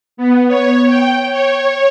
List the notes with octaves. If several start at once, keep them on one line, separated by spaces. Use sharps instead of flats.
B3
C#5
G5
C#5